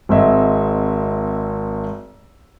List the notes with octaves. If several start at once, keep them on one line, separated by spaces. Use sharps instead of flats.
G#1 C4 G#4 D#5 E5